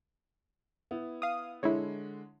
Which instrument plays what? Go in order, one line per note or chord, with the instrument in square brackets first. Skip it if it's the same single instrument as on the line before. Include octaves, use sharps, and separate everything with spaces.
[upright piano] B3 E4
[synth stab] F5 D#6
[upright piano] D3 G#3 [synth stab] E4 C#5